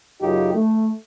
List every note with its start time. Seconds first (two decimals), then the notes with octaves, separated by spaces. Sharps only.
0.20 F#2 C#3 D#4 F4 G4
0.53 A3